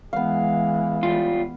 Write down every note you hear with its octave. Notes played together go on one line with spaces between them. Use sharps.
E3 G#3 B3 F5
G3 F4